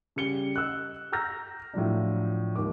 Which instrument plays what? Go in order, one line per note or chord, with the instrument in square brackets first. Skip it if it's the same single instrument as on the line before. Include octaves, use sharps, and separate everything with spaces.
[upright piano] C#3 G3 C#7 G7
D#5 E6 F#6
A#5 E6 F6 G6 A#6
A2 F3 F#3 D4
G#1 D#2 D6